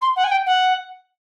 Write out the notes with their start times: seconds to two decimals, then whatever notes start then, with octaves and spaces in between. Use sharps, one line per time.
0.01 C6
0.16 F#5
0.24 G#5
0.31 G5
0.46 F#5